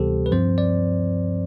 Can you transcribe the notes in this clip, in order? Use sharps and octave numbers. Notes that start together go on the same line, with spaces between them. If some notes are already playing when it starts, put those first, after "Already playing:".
Already playing: D2 C3 E3 G3 B3 G4 A4 C5
B4
G2 F3 C4 C5
D5